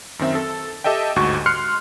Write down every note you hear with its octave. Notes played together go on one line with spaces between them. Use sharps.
F#2 D#3 C4 E5
A4
G4 A4 D#5 E5 G5
G1 D2 G#2 F#4 C#6
C6 F6 F#6 C7 C#7